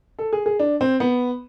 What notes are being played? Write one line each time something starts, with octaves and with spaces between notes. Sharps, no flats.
A4
G#4
G#4
D4
C4
B3